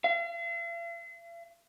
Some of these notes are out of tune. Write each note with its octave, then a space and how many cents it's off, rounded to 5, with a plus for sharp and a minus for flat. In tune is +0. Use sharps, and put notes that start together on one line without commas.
F5 -45